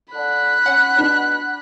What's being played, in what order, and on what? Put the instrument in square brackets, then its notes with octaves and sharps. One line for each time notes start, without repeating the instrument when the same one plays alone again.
[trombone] D3 [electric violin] B5 F#6
[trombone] C#4 [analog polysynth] F#5
[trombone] B2 [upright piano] D4